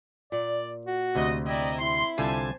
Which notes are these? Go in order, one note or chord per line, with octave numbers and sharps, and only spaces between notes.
A#2 D5
F#4
D2 C3 D#5
C4 E4 D5 D#5 A#5
E4 C6
C2 D3 F4 G4 C5 G#5 A5